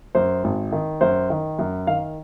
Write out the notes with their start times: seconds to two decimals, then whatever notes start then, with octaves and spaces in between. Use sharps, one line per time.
0.15 F#2 C5
0.44 G#1
0.72 D#3
1.01 F#2 C5
1.30 D#3
1.59 F#2
1.87 D#3 F5